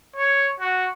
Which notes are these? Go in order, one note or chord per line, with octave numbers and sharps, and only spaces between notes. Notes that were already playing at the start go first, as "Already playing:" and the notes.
C#5
F#4